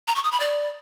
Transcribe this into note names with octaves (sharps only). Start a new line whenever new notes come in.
A#5
C#6
D#6
B5
D5